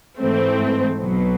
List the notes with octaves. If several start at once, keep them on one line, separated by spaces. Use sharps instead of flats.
G#2 E3 A3 C4
B1 B2 F#3